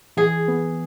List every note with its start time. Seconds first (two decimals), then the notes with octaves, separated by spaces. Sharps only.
0.17 E3 G#4
0.48 B3